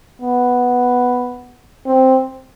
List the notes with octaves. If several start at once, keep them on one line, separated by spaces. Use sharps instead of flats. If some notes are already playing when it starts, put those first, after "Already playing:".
B3
C4